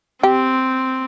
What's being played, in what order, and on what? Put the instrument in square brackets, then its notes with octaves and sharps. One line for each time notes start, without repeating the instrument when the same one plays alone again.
[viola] C4 [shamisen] G4